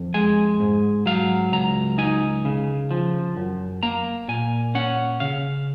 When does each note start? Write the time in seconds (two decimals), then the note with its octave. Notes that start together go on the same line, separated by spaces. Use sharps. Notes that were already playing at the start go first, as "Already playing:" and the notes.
Already playing: F2
0.14 G#3 G#5
0.60 G#2
1.06 F#3 F5
1.52 C#2 A#5
1.98 D#4 G#5
2.45 C#3
2.91 F3
3.37 F#2
3.83 A#3 A#5
4.28 A#2 G#5
4.75 C#4 F#5
5.20 C#3 F5